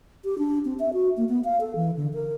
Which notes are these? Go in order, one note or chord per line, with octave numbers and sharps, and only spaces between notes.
G4
D4
C4
E5
F#4
A#3
B3
F5
A4
E3
D3
A#4